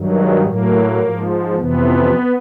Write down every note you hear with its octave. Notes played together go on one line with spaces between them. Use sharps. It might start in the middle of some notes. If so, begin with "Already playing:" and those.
Already playing: G2 D#3 F#3
G#3
A2 F#3 A#3
G#2 F3
F2 C3 E3 B3